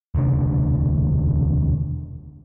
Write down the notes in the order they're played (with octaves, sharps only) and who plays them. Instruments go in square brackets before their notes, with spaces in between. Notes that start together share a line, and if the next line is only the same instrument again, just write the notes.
[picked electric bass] E1 D2 C3 D4